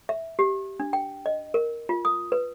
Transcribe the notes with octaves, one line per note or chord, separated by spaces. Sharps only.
E5
G4
D4
G5
D#5
A#4
F4
D#6
B4